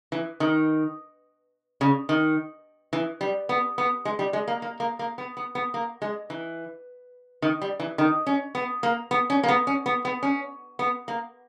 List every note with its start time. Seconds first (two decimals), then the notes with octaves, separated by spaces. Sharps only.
0.12 E3
0.40 D#3
1.81 C#3
2.09 D#3
2.93 E3
3.21 G3
3.49 B3
3.78 B3
4.05 G#3
4.19 G3
4.33 G#3
4.48 A#3
4.62 A#3
4.80 A#3
4.99 A#3
5.18 B3
5.37 B3
5.55 B3
5.74 A#3
6.02 G#3
6.30 E3
7.42 D#3
7.62 G3
7.80 E3
7.98 D#3
8.27 C#4
8.55 B3
8.83 A#3
9.11 B3
9.30 C#4
9.43 A#3
9.48 B3
9.67 C#4
9.86 B3
10.05 B3
10.23 C#4
10.79 B3
11.08 A#3